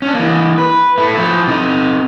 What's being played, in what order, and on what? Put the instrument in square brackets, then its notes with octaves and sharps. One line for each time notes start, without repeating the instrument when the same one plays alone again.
[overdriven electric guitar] C#4 D4
E3 A#3
B4
A3 E4
F3 E4
C3 D#4